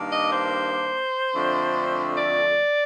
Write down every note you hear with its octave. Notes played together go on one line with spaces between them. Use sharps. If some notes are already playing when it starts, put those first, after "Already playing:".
Already playing: G2 D#3 A#3 D4
D#5
C5
F2 D3 A3 D4
D5